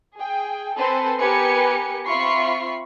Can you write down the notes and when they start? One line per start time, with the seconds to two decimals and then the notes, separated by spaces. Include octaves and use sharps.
0.19 G#4 G5
0.76 C4 A4 B4 C5 G#5
1.20 B3 G4 A#4 B4 G#5 C#7
2.08 C4 F4 E5 B5 C#6 C7